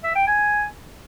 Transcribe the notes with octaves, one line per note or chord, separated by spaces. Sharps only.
E5
G5
G#5